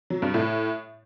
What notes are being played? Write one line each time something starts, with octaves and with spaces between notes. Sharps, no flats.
F#3
G2
A2